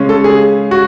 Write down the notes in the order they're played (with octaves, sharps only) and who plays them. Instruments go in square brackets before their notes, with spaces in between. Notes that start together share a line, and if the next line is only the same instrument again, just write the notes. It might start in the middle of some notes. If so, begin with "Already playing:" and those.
Already playing: [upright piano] C#3 G#3 C#4
[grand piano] A4
G#4
F#4